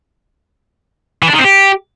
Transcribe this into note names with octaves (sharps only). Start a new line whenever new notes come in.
E3
D4
D#3
C4
G4